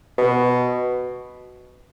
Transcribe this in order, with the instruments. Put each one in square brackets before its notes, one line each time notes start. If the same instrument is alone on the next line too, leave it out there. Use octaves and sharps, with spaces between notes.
[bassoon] B2